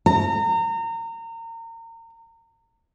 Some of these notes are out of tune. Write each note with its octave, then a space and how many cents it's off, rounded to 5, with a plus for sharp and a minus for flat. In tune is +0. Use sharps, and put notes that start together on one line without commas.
A#5 -30